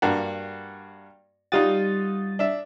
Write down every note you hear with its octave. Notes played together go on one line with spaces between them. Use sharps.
G2 A#3 F#4
G3 D#4 F4 F#4 D#6 A6
D4 E5